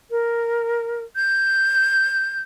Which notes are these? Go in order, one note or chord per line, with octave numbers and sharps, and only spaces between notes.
A#4
G6